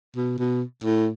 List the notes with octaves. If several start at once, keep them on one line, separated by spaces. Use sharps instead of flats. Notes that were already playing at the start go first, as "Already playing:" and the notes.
B2
B2
A2